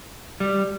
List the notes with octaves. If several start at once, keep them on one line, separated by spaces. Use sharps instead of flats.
G3